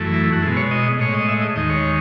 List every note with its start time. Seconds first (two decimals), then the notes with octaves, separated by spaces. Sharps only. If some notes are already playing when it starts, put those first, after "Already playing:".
Already playing: F#2 E3 A3
0.13 E4
0.32 F#4
0.42 B2 G#3 E4
0.57 C#5
0.71 D#5
0.99 A2 G#3 C#5
1.14 D#5
1.28 E5
1.42 D#5
1.56 D#2 D#3 G#3 D#5
1.70 C#5